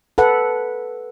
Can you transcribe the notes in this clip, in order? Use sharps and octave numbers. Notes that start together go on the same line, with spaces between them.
A4 B4 F#5